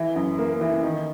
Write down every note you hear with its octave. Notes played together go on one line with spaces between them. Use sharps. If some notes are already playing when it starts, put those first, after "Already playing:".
Already playing: E3
F#2
A#3
E3
D#3